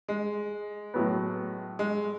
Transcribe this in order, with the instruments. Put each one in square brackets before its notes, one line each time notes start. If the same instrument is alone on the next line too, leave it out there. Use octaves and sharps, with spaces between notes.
[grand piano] G#3
[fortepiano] A2 F#3 B3
[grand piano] G#3